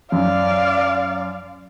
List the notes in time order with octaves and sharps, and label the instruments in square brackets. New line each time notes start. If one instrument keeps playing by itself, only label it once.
[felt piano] F#2 [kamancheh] D5 F5